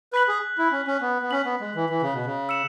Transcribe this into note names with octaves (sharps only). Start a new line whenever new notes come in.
B4 F#6 B6 F#7
G#4
E4
C#4
C#4
B3
B3
C#4 F#6 B6 F#7
B3
G#3
E3
E3
C#3
B2
C#3
E6 C#7 E7